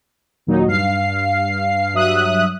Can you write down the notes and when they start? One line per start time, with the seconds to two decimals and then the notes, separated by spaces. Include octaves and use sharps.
0.47 D#2 A#2 F#3 D#4
0.67 G2 F5 C7
1.93 G2 F#3 E5 D#6 F#6